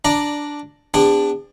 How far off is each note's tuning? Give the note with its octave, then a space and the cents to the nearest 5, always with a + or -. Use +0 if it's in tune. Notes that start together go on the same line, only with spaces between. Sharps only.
D4 +0 D5 +10 A#5 +0
B3 +45 D4 +5 G#4 -45